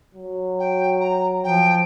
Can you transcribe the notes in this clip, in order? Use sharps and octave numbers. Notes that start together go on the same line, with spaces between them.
F#3
G5
A#5
F3 G5